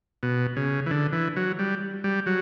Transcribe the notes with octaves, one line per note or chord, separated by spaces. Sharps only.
B2
C#3
E3
D3
E3
F#3
G3
G3
F#3